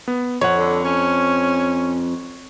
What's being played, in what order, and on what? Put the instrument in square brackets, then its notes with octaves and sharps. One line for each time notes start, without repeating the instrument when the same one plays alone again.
[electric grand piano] B3
[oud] F2 [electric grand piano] C#5 F#5
[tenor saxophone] D3
C#4